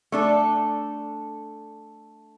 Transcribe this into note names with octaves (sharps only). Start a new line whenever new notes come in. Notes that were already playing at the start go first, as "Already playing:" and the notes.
A3 D4 A4